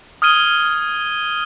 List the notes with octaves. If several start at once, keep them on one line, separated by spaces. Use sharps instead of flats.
D#6 F6 G#6 D#7 G7